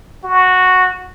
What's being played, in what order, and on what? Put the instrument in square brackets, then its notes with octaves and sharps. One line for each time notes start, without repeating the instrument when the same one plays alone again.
[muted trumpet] F#4